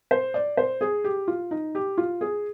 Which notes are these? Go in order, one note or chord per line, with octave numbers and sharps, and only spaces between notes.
C5
D5
C5
G#4
G4
F4
D#4
G4
F4
G#4